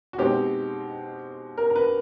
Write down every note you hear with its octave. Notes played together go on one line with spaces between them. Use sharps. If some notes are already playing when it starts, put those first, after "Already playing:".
F#4
B2 G#3 C4 D#4 G4
A#4
A#4
B4